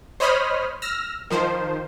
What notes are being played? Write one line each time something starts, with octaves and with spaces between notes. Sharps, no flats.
C5 C#5 D#5 B5 D#6 F6
E6 F6 A#6
D#3 F3 C5